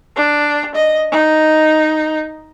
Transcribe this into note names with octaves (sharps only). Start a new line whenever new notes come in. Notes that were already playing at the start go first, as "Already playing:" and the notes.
D4
D#5
D#4